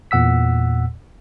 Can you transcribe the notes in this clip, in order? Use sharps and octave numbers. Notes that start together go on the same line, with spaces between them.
E2 A#2 F#5 E6 B6